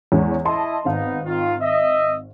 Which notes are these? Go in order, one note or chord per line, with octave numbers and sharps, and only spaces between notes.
E2 G#3 C#4
E4 D#5 A5 C6
G#1 B3 D#4 F5
D#3 F4
D#5 E5